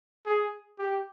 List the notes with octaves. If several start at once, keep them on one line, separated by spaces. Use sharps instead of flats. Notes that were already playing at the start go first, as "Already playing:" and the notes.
G#4
G4